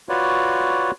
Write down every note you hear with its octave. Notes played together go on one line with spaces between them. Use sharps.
F4 F#4 B4 C#5 D5